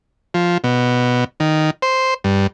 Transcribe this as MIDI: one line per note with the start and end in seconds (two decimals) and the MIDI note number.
0.34 0.58 53
0.64 1.24 47
1.40 1.70 51
1.82 2.14 72
2.24 2.47 43